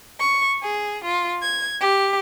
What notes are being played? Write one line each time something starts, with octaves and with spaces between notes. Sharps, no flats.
C#6
G#4
F4
G#6
G4